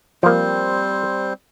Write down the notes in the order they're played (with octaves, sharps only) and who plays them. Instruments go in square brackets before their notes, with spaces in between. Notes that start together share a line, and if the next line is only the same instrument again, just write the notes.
[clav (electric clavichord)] F3 A#3 [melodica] G3 C4 C5